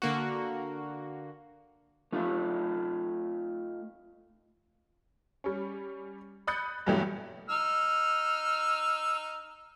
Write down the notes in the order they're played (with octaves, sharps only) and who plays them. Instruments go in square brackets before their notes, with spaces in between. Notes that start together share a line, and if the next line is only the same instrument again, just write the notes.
[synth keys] D3 A#3 F#4
[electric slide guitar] A3 D#4 F4
[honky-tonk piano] G3 C#4
B5 D#6 F#6 G6 A6 C#7
G2 B2 E3 F#3 A3 G4
[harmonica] D#4 E6 F6